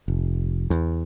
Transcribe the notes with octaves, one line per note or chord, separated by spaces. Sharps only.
F1
E2